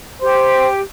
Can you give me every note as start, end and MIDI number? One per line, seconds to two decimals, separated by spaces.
0.22 0.81 67
0.22 0.67 72